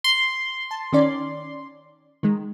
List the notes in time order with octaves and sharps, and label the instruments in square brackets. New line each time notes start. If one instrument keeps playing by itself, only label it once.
[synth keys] C6
[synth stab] A5
D#3 C#4 D5
D#3 G#3